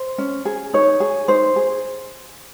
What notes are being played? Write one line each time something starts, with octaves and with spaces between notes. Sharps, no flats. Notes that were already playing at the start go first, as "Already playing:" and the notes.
Already playing: C5
C#4
G#4
D#4 C#5
G#4
D#4 C5
G#4